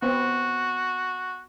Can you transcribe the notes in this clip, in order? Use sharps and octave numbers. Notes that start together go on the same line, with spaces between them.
B3 C4 F#4